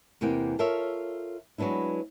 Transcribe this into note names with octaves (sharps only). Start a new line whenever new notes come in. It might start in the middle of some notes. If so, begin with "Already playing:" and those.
E2 C3 E3 A#3 F#5 G5
F4 A4 A#4 C#5 E5
F#3 G#3 B3 D4 E4